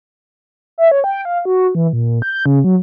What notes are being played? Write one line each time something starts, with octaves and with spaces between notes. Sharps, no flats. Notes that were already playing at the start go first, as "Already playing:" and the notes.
E5
C#5
G5
F5
F#4
E3
A#2
G6
C#3
F#3